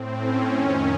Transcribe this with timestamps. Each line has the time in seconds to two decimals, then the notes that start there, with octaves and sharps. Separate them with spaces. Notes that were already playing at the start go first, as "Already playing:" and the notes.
Already playing: A2 C4
0.20 C#4
0.54 F2 D#3